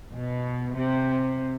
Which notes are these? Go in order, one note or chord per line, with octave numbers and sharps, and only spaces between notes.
B2
C3